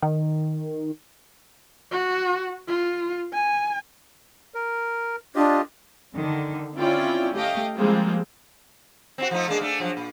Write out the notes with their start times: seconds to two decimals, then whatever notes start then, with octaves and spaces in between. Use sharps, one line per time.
0.02 D#3
1.91 F#4
2.68 F4
3.33 G#5
4.54 A#4
5.36 D4 F4 G4 D#5
6.15 D3 D#3
6.75 C4 C#4 E4 F4 D5 G5
7.34 A3 G4 D#5 F5 G5
7.75 F3 G3 G#3 A#3 C4 F4
9.18 C4 C#4 F#4
9.31 F3 A3 D#4
9.48 G#3 A#3 D4
9.61 A3 D4
9.80 F3 F#3
9.97 A#2